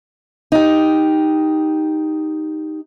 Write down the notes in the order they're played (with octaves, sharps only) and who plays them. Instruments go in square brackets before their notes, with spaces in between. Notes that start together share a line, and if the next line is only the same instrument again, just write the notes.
[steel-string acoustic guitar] D#4 G4